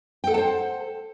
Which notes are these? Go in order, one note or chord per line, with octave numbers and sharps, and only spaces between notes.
A4 C5 F#5 G5 A5